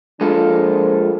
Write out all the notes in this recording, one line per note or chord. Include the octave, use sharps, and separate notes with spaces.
F3 G#3 A#3 D4 F4 A4